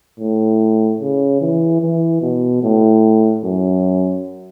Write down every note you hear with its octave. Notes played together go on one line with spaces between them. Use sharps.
A2
C#3
E3
E3
B2
A2
F#2